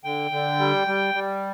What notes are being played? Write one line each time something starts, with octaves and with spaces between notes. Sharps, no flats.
D3 G5
D3
G3
G3
G3